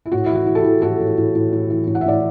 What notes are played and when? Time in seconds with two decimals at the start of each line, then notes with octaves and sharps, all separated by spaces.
0.06 E4
0.12 A2 F#4
0.26 E3 E4
0.35 F#4
0.47 E3
0.55 A4
0.58 E4 G4
0.64 E3
0.82 A2 F#4 A4
1.00 A2
1.18 A2
1.35 A2
1.52 A2
1.70 E3
1.87 A2
1.95 F#5
2.01 E5
2.06 A2 D5